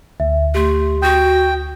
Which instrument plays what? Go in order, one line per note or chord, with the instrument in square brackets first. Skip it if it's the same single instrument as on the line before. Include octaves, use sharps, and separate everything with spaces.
[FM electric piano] D2 [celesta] E5
[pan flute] A3 [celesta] G4 C6
[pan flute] F#4 [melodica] G5 [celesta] D#6 G6